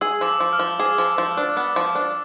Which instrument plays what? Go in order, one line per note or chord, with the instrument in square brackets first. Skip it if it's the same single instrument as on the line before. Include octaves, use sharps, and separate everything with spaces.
[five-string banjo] G#4 [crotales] E6
[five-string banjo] F3 [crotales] D6
[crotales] E6
[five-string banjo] F3
[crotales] F6
[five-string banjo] F3
[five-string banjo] G#4 [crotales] D6
[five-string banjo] F3
F3
D4
B3
F3
D4